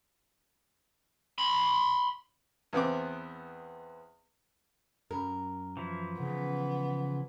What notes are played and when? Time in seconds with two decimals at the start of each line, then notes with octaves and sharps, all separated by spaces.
1.38 B5 C6
2.73 E2 B3 C4 D6
5.11 F#2 A#4
5.77 E3 F3 E4
6.20 C#3 B3